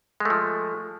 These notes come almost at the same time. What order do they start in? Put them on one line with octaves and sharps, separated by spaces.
G#3 A3 F3